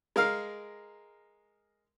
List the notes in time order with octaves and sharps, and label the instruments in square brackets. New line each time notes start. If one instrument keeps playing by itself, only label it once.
[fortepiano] G#3 A#4 F5 F6